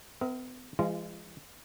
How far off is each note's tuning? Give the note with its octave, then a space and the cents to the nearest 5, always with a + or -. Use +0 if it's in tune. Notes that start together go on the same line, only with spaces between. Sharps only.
B3 +45 A#4 +0 E5 +0
E3 +45 G#3 -20 F4 -25